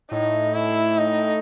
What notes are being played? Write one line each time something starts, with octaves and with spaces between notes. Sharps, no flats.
A2 D#4
E4
D#4